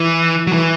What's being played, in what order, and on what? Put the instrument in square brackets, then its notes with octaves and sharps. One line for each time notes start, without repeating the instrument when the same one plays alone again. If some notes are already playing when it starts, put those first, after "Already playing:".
Already playing: [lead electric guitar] E3
F#3
E3